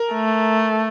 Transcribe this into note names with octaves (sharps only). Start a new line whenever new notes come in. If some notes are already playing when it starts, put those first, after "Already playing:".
Already playing: A#4
A3